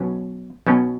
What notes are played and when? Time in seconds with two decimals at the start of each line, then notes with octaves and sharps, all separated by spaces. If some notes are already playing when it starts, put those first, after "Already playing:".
Already playing: B1 B2 F#3 C#4
0.66 B1 B2 F#3 C#4